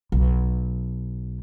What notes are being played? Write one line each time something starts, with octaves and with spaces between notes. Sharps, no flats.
B1